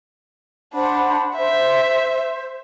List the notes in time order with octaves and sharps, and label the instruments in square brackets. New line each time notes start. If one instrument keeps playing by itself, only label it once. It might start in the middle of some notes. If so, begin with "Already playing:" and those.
[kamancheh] D4 [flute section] C5 F#5 B5
[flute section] C5 [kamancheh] E5